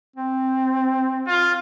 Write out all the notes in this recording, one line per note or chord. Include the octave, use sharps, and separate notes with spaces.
C4
F4